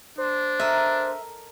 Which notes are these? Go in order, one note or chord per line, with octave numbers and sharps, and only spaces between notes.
D4 C5
A4 A#4 D#5 E5